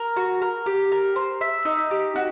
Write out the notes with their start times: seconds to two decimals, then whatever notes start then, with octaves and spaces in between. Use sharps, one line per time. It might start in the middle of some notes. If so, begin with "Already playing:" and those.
Already playing: A#4
0.16 F#4
0.42 A#4
0.66 G4
0.92 A#4
1.16 C5
1.41 E5
1.65 D#4
1.91 G4
2.16 F#4